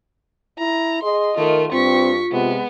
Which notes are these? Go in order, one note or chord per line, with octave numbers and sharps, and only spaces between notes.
E4 A#5
G#4 D#5 C6
D#3 A3 F4 A#4
G2 C4 F4 C#6 B6
C3 G#3 B3